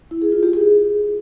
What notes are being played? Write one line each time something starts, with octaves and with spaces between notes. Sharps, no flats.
E4
G#4
F4
G4
G#4